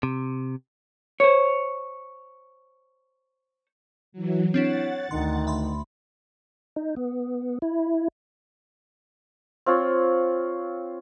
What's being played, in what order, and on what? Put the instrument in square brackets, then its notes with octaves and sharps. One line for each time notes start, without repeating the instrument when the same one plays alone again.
[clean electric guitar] C3
[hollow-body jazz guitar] C5 C#5
[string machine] E3 F#3
[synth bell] C4 D4 E4 [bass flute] C#5 [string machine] F#5 A6
[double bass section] D2 [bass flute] D#3 [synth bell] C6
[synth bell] E5 B5 C6
[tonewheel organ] D#4
B3
E4
[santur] C4 F4 C#5